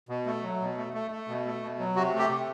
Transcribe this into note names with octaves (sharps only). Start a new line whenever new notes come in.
B2
A3
F#3
B2
A3
A3
A3
B2
A3
B2
F#3
C3 F#4
A3
G4
C3